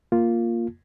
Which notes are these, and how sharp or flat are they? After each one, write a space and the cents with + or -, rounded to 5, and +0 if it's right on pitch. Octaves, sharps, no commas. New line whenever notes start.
A#3 +0 F4 +0